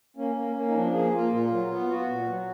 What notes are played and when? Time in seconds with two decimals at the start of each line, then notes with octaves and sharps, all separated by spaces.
0.16 A#3 C#4
0.36 A#3
0.56 A#3
0.68 D#4
0.74 F3 D4
0.93 A#3 G#4
1.13 A#3 F4
1.31 A#2 F4
1.51 F#3
1.70 B3
1.89 B3 F#4
2.09 A#2
2.28 F#3